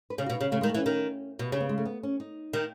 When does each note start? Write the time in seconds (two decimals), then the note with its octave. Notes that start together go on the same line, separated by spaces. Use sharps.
0.10 B4
0.18 C#3 G#4
0.26 F#4
0.30 B2
0.35 D#4
0.41 C#3
0.44 C#4
0.52 C#3 A3
0.61 D#3 G#3
0.69 A3
0.75 E3
0.77 C#4
0.86 D#3
1.39 B2
1.52 C#3 C#4
1.60 B3
1.69 G#3
1.78 A3
1.85 B3
2.03 C#4
2.20 D#4
2.53 D#3